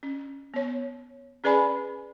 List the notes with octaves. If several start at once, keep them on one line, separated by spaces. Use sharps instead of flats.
C#4
B3 C#5
C#4 G#4 B4 D5 G#5 B5